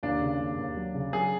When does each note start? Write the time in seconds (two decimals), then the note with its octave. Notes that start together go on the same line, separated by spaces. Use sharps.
0.03 D#2 D4
0.21 C#3
0.39 D#2
0.58 D#2
0.77 F#3
0.94 C#3
1.13 F#3 G#4